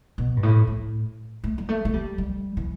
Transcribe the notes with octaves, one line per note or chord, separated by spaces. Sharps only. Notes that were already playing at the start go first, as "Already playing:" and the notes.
B2
G2
A2
A2
A3
G3
A3
A3
G3
G3
E3